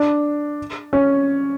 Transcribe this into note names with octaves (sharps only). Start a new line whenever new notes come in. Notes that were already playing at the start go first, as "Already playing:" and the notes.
Already playing: D4
C#4